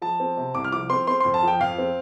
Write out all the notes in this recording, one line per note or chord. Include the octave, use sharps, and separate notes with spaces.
F3 A5
C4
C3
C2 D6
F6
F3 D6
C4 C6
C4 C6
F2 C6
A5
F3 G5
F2 F5
C4